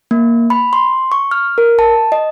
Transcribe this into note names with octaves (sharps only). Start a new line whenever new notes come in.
A#3
B5
C6
C#6
F6
A#4
A5
D#5